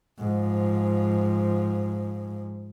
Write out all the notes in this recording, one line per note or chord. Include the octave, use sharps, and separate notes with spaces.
G#2 F3